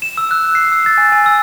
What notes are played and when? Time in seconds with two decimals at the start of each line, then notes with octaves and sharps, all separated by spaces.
0.02 E7
0.17 E6
0.31 F#6
0.55 C7
0.72 E6
0.86 A6
0.98 G#5
1.12 G#5
1.26 E6